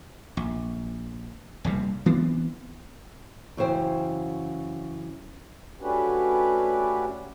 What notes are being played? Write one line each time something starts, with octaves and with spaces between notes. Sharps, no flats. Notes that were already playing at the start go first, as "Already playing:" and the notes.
A#1
F1 A#1 C3 G3
E3 B3 C4 D4
F#2 C#3 E3 C5 G5
A3 C#4 D4 F#4 G4 B4